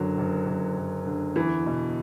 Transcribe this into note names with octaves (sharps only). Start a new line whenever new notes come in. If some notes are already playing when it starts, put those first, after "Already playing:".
Already playing: F#1 D3 F#3
F#1
F#1
F#1
D3
E2 E3
B2